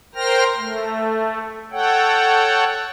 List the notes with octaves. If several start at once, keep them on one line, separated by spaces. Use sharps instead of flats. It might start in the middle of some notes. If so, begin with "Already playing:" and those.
A#4 C5 G5 F6 A#6
A3
A4 C#5 F#5 G5